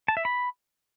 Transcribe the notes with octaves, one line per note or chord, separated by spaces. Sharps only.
A5
E5
B5